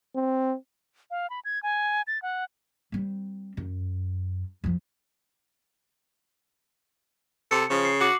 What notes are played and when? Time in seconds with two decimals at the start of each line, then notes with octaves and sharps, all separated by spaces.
0.15 C4
1.11 F5
1.30 B5
1.45 G#6
1.63 G#5
2.07 A6
2.22 F#5
2.92 G3 C4
3.57 F#2
4.64 F2 F3
7.51 C3 A4 C#7
7.70 C#3 F3
7.85 C7
8.00 F#4 D6 F#7